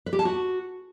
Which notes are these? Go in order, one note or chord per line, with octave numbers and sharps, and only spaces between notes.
B4
G4
A5
F#4